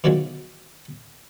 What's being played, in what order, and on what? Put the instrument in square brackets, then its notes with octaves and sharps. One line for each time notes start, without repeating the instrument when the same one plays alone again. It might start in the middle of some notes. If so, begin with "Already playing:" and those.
[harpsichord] B2 D3 D#3 F3 F#3 G#3